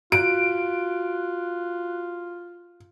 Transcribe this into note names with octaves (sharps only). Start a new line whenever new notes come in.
F4 F#4 F#6 D7